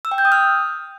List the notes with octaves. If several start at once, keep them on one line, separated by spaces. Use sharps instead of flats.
E6
G5
G6
D#6
F6